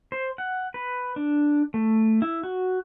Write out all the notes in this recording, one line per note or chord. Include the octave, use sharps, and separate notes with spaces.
C5
F#5
B4
D4
A3
E4
F#4